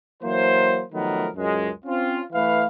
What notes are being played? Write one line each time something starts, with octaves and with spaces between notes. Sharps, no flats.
E3 F#3 A#3 C5
D#3 F3 F#3 A3 B3 A#4
C#2 F#2 G#3
C4 C#4 F4
E3 A3 B4 F5